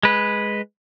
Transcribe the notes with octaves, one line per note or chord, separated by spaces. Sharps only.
G#3 B4